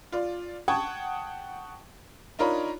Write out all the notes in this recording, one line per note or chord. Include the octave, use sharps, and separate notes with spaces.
F4 D5
F#5 G5 A5 C#6 D#6 G#6
D4 D#4 F4 A#4 C#5 B5